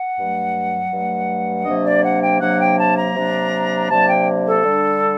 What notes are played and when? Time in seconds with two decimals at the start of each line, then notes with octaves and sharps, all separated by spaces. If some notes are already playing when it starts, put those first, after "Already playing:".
Already playing: F#5
0.16 G2 F#3 A3
0.91 G2 F#3 A3
1.65 C3 F#3 A#3 D4 D#5
1.84 D5
2.03 F#5
2.22 G5
2.40 C3 F#3 A#3 D4 F#5
2.59 G5
2.78 A5
2.96 A#5
3.15 C3 F#3 A#3 D4
3.89 C3 F#3 A#3 D4 A5
4.08 G5
4.46 A4
4.64 D3 G3 D4